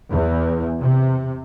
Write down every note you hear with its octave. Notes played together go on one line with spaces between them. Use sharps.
E2
C3